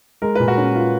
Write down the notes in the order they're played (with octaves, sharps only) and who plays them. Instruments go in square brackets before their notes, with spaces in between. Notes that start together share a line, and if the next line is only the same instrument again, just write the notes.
[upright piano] G#3 [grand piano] A#4
[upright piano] A#2 [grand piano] B4
[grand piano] F#4 A#4
[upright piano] C#4
F4